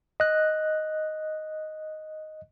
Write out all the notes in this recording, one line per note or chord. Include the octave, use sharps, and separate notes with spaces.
D#5 F#6